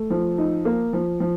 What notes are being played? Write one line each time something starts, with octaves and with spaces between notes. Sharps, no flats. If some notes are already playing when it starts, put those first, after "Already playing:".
Already playing: A3
F3
D#4
A#3
F3
F3